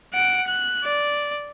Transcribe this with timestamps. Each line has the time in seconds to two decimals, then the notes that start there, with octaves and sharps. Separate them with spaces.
0.14 F#5 D7
0.48 F#6
0.84 D5